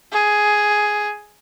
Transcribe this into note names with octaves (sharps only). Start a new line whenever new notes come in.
G#4